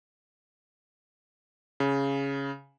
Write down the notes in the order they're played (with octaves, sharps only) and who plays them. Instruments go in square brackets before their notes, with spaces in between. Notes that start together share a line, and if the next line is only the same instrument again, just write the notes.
[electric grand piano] C#3